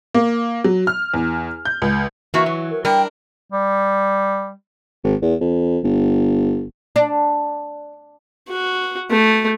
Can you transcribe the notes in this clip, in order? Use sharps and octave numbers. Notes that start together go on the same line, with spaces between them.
A#3
F#3
F6
E2
G6
C#2
E3 A#3 F#4 E5
F#3
A#4
G3 D4 A#4 G5
G3
G#1
E2
F2
G1
D4
F#4
A3